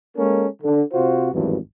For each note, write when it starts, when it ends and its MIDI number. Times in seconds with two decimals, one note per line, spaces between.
0.17 0.47 56
0.17 0.47 58
0.17 0.47 61
0.17 0.47 69
0.17 0.47 70
0.62 0.82 50
0.93 1.29 48
0.93 1.29 65
0.93 1.29 66
0.93 1.29 72
1.33 1.57 32
1.33 1.57 40
1.33 1.57 43
1.33 1.57 52
1.33 1.57 54